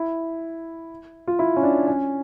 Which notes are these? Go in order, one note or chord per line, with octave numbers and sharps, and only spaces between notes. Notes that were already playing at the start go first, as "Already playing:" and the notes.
Already playing: E4
F4
E4
C#4
D4
C#4